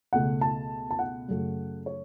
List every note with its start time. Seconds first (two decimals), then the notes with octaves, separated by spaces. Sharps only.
0.13 C#2 B2 A3 F#5
0.41 A5
0.91 A5
0.99 F#5
1.28 F#2 C#3 F#3 A3
1.86 C#5